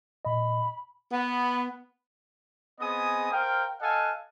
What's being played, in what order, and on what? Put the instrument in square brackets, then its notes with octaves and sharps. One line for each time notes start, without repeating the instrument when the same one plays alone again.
[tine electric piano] A#2 D#5 [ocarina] B5
[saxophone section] B3
[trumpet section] B3 C4 G#4 D#5 G#5 D#6
A#4 C5 F5 G5
A4 D#5 F5 F#5 G#5 A5